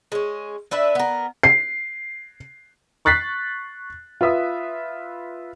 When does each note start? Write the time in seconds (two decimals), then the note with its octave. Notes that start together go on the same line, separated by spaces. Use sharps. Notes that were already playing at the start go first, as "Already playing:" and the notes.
0.12 G#3 C#4
0.71 D4 B4 E5
0.95 B3 A#4
1.43 C7
3.05 C#6 F#6 A6 B6 C7
4.21 F4 B4 E5 D#6